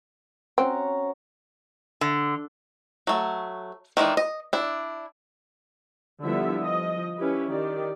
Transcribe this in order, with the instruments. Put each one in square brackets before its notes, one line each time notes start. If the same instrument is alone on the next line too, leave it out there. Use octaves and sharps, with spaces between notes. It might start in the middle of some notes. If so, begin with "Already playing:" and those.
[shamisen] C4 [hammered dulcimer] C#4 F#4 A#5
[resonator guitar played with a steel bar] D3
[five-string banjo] F#3 A3
D#3 E3 G#3 D4
D#5
D4 E4
[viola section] D3 F3 G3 B3 E4 E5
F3 D#5
C#4 E4 G4 B4
D#3 G4 D5